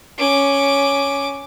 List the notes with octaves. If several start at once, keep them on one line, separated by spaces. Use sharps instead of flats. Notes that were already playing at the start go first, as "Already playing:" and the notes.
C#4 D6